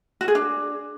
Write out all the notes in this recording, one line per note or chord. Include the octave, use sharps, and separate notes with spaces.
F#4
G#4
D4